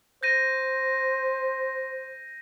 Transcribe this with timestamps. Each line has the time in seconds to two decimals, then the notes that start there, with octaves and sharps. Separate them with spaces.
0.23 C5 G6 A#6 D#7